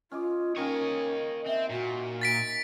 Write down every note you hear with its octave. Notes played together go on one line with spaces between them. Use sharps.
C#4 F4 D#5 D6
D#3 A#3 C#4 C#5 D#5
C4 E5
A#2 F#4
A6 B6 D7